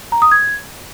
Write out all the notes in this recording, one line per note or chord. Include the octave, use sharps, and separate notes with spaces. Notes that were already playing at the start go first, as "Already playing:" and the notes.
A#5
D#6
G#6